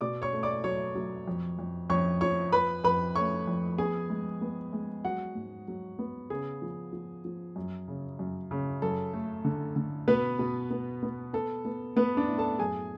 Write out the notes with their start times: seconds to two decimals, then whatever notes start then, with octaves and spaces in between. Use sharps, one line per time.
0.01 B2 D5 D6
0.22 C#5 C#6
0.33 A3
0.43 D5 D6
0.64 F#3 C#5 C#6
0.95 F#3
1.28 F2
1.59 F2
1.90 F2 C#5 C#6
2.21 F3 C#5 C#6
2.52 F2 B4 B5
2.84 F2 B4 B5
3.16 A3 C#5 C#6
3.47 F2
3.78 B3 G#4 G#5
4.10 G#3
4.41 B3
4.73 G#3
5.05 F#3 F#4 F#5
5.35 G#2
5.68 F#3
5.99 B3
6.30 C#3 G#4
6.62 F3
6.93 F3
7.25 F3
7.56 F#2
7.88 C#3
8.19 F#2
8.51 C#3
8.82 F#2 A4
9.13 A3
9.45 D3
9.76 D3
10.08 B2 B3 B4
10.39 B2
10.71 B3
11.03 B3
11.33 B3 A4
11.65 B3
11.97 B3 B4
12.17 D4 D5
12.28 A2
12.38 A4 A5
12.59 F#2 G#4 G#5